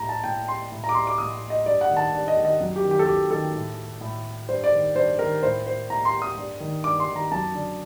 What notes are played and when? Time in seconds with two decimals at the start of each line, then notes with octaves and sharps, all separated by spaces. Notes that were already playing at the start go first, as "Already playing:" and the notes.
Already playing: A2 A#5
0.09 A5
0.24 A2 G5
0.48 C6
0.72 A2
0.84 A#5
0.89 D6
0.94 C6
1.07 D6
1.18 A2 D#6
1.50 D#5
1.66 G2 D5
1.81 F#5
1.89 D#3
1.97 A5
2.13 G2
2.28 D#5
2.36 D#3
2.45 D#5
2.60 F#2
2.76 G4
2.84 D#3
2.91 G4
2.99 A4
3.06 F#2 G4
3.31 D#3 A4
3.55 A2
4.01 A2
4.49 G2 C5
4.64 D5
4.72 D#3
4.96 G2 C5
5.19 D#3 A#4
5.43 A2 C5
5.67 C5
5.90 A2 A#5
6.05 C6
6.22 D#6
6.37 G2
6.60 D#3
6.84 G2 D6
7.00 C6
7.08 D#3
7.16 A#5
7.31 F#2 A5
7.54 D3